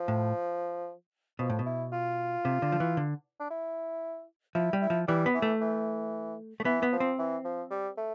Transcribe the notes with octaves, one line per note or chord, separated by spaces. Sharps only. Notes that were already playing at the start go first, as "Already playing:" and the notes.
Already playing: F3
A2
B2 F3
A2
B2
E4
F4
C3
D3
F3
E3
D3
D4
E4
F3 E4
G3
E4
F3
E3 G3
B3
E3
A3
E3
A3
E3 B3
B3
F3
C4
E3
F3
G3
A3